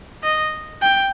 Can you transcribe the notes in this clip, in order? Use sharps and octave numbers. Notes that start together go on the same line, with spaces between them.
D#5
G5